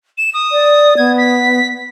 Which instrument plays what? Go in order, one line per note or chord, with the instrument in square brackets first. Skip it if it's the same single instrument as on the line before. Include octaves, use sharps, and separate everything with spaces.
[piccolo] E7
D#6
[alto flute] D5
[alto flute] B3 [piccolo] G#6
[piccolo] B6